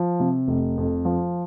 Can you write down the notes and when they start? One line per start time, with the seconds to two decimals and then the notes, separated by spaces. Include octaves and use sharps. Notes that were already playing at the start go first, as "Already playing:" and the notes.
Already playing: F3
0.20 C3
0.48 F1
0.77 F2
1.05 F3